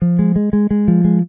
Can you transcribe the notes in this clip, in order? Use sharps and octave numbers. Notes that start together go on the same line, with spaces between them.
F3
G#3
G#3
G#3
G#3
F3
G#3